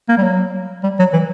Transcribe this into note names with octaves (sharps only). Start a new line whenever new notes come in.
A#3
G3
F#3
G3
F#3
E3